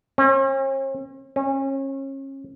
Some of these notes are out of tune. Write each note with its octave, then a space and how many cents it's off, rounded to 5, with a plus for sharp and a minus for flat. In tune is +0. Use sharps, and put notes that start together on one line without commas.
C#4 -45
C#4 -30